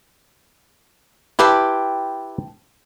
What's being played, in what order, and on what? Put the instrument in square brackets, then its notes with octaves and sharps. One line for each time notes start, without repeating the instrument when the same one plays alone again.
[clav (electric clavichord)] E4 G4 B4 [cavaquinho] G5 A5 C6